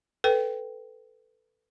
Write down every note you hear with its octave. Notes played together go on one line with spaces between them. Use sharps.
A4 B4 G5